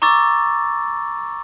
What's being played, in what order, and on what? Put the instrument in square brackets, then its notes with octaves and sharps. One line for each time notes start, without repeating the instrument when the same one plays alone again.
[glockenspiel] A#5 C#6 D6 E6 A6